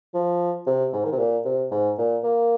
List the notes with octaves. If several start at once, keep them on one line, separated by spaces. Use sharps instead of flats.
F3
C3
G#2
D#3
C3
A#2
C3
G#2
A#2
A#3